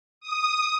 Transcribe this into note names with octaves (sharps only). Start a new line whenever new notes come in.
D#6